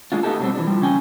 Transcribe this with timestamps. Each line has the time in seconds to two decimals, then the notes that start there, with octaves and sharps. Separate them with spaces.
0.12 G#3 D4 F4
0.23 A3 B3 D#4 F#4 G4 A4
0.39 B2 D3 F#3 G3 C4
0.55 E3 D4
0.67 F3 G3
0.81 C#3 C#4 G5 G#5